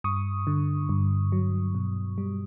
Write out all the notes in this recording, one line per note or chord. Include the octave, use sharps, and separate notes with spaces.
G2 C#6 D#6
D3
G2
F#3
B2
G3